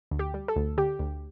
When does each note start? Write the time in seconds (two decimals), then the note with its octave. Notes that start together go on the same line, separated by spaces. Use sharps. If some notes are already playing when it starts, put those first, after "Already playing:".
0.11 D2
0.19 G4
0.34 G3
0.48 A4
0.56 D2
0.78 D3 G4
0.99 D2